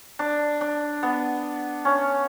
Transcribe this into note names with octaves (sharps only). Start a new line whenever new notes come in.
D4
D4
B3
C#4